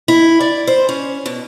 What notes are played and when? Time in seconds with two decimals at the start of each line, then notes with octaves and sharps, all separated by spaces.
0.08 E4
0.41 D5
0.67 C5
0.89 C#4
1.26 B2